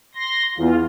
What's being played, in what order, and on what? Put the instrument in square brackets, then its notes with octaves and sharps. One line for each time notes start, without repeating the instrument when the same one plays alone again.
[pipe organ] C6 A#6
[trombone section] E2 [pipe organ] F4